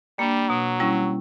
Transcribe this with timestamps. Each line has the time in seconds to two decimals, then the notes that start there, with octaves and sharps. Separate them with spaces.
0.19 G3 A#3 D4
0.49 B2 F#3
0.80 G3 C#4 E4